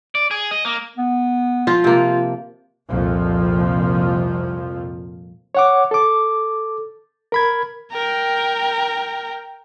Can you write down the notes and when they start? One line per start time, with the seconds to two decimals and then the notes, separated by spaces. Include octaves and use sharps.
0.15 D5
0.31 G#4
0.51 D#5
0.65 A#3
0.98 B3
1.67 F3 F4
1.84 C3 A#3 F4
2.89 C2 F2 A#2 F3
5.55 C#5 F#5 D6
5.91 A4 D6
7.32 A#4 B5 G#6
7.92 A#4 G5